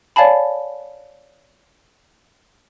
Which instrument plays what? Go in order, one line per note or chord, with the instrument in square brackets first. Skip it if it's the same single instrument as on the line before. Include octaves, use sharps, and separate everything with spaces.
[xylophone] C#5 D5 F5 G#5 A5 B5